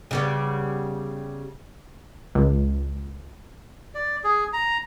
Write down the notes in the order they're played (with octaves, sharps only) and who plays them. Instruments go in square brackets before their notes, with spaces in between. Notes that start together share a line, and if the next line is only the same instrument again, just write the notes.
[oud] C#3 G3 B3
[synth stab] C#2
[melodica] D5
G#4
A#5